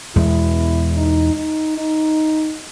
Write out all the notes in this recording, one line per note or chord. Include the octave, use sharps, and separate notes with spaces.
E2 B2 G#3 E4
D#4
D#4
D#4